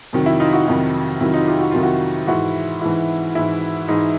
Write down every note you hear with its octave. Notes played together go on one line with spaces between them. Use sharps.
F2 C3 D#3 F#3
E4
D#4 F4
E4 F#4
F2 C3 D#3 F#3 E4
F2 C3 D#3 F#3 E4
D#4 F4
F4 G4
F#4
F2 C3 D#3 F#3 F4
E4 F#4
G#2 E3 E4 F#4
G#2 E3 E4
G#2 E3 E4
G#2 E3 D#4